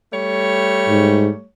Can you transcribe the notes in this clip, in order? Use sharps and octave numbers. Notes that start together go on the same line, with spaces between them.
G3 A3 C#5
G#2